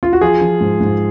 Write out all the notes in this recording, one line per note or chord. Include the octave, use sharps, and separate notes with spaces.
F4
F#4
F3 F4 G#4
F3
G#2
G#2